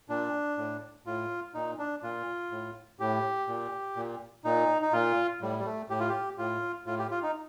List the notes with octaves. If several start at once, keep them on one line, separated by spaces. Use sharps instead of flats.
A#2 D4
A2
A2 F4
A#2 D#4
D4
A#2 F4
A2
A2 G4
A#2
A#2
A#2 D#4
D#4
A#2 F4
A2 G3
G3
A3
A2 G4
F4
G4
A2 F4
A2 F4
G4
F4
D#4